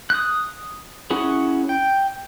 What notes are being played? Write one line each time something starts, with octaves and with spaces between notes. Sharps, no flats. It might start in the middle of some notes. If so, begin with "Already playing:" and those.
D#6 F#6
C#4 E4 F#4 G#4
G5